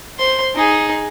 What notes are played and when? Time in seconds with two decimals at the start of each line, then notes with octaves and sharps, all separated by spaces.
0.18 C5 C6
0.55 D#4 G#4